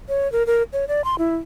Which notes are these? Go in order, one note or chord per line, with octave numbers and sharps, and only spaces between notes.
C#5
A#4
A#4
C#5
D5
C6
E4